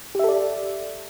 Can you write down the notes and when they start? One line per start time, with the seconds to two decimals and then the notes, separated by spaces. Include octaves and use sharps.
0.15 G4
0.19 E5
0.24 A4
0.29 D5